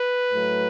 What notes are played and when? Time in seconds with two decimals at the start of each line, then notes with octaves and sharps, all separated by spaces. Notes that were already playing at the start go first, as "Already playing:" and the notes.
Already playing: B4
0.30 A2 F#3 A3